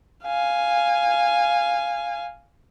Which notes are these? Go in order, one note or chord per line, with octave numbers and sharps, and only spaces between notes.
F5 G#5